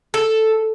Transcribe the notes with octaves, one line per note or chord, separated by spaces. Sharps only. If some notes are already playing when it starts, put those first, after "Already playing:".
A4